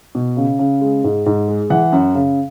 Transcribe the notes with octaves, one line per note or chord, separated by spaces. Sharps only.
B2
C#3
C#3
G#3
G#2
G#2
G#3
E3 F#5
F#2
C#3